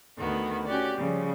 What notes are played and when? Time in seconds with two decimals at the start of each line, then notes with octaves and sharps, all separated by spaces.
0.17 D2 D3 D#3 B3 F#4
0.66 C#4 F#4 G4 D5
0.97 C#3 F3 G3